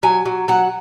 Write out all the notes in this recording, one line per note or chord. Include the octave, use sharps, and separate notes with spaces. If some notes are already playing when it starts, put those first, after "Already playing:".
F#3 G#5
F#3
F#3 F#5